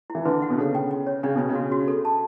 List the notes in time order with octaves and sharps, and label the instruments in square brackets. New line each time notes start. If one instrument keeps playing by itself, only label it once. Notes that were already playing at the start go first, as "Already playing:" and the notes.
[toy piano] E4
[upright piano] E3
[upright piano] D3 [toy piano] B4
[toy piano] F#5
[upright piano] B2
[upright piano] C#3 [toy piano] A4
[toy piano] G5
G5
C#5
[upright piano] C#3 [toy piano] D4
[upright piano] B2 [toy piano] D4
[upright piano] C#3
[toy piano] F#4
F#4
A4
A5